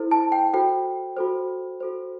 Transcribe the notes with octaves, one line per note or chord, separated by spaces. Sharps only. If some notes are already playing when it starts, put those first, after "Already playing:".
Already playing: E4 A4 C5
A5
G5
F#4 A4 C5 G5
F#4 A4 C5
F#4 A4 C5